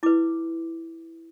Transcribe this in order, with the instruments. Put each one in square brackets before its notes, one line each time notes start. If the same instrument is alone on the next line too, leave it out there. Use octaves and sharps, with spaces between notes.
[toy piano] E4 B4 D6